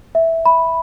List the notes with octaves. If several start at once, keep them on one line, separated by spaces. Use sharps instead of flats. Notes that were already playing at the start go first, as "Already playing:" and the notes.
E5
B5